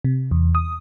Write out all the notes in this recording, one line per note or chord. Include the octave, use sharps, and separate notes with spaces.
C3
E2
D#6